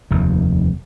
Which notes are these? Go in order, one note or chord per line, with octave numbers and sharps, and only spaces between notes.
F1 D#2